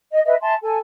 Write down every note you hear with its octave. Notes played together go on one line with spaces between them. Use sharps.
D#5
B4 D#5 E5
E5 G#5 A5 C6
A4 G#5